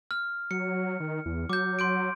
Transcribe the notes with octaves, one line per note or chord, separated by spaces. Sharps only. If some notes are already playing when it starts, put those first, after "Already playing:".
F6
F#3 C#7
D#3
E2
F#3 D6 G6
C6 G6 D7